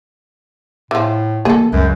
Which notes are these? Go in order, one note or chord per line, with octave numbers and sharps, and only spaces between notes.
A2 E3 F3
E3 A#3 G#4 A4
C#2 F#2 F#3 C4